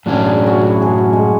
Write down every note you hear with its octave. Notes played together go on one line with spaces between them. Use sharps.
A2 F#3 C#4 D4
G#4
F#4
E4
G#4
F#4
G#3